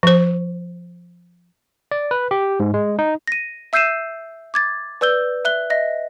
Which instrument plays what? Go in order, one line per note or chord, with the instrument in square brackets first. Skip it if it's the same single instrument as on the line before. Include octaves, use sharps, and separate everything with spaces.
[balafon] F3 C5
[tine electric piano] D5
B4
G4
G#2
G#3
D#4
[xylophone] A#6 D#7
E5 E6 G6 C7 D#7 E7
D6 G#6 A6
B4 D5 E6 G6 G7
E5 F#6 G7
D#5 E5 A#6